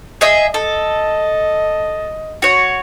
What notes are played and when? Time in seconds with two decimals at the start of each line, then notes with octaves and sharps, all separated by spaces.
0.21 G#4 D#5 E5
0.54 A4 D#5
2.42 F#4 C#5